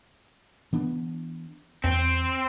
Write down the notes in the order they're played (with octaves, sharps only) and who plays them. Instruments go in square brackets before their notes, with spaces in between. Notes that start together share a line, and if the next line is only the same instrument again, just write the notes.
[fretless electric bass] E3 B3 D4
[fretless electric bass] E2 [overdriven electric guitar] C4